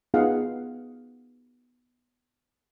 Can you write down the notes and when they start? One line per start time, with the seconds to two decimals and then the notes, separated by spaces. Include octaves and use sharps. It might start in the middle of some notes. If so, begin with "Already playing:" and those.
0.14 B3 D#4 F4 G#4 F5 F#5